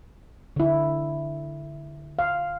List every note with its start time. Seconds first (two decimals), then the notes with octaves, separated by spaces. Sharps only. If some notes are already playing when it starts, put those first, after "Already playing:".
0.56 D3 E4
2.19 F5